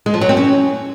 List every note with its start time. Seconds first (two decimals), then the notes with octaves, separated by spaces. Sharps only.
0.06 G#3
0.14 F3
0.21 F#3
0.29 C4
0.37 C#4